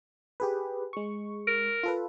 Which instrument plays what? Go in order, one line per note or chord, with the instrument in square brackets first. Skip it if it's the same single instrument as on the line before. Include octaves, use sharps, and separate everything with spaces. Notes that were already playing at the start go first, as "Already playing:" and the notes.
[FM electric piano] G4 G#4 B4
G#3 C#6
[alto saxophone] A#4
[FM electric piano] F4 A4 B4